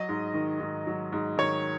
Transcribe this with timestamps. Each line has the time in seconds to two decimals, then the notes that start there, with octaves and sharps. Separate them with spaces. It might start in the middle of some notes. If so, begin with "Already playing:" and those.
Already playing: F#3 D#5
0.09 G#2
0.34 D#3
0.60 G#2
0.87 F#3
1.13 G#2
1.38 D#3 C#5